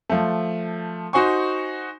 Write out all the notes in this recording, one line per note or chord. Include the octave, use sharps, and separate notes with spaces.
F3 A3
D#4 F#4 C5 G#5 C#6